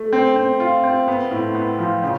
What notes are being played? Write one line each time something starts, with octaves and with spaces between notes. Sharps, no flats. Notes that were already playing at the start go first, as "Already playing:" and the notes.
Already playing: A3
C4
C4
F4
C4
B3
A2
B3
F3
C#3